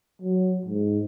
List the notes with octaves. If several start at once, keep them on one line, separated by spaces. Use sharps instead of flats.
F#3
G#2